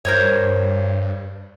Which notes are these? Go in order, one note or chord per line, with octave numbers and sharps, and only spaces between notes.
G2 A#4 C5 C#5